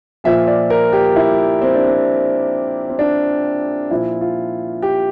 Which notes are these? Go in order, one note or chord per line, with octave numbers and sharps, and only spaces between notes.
A#2 F3 E5
D5
A#4
G4
E4
C4
D4
C4
C4
D4
A#2 F3 E4
F4
G4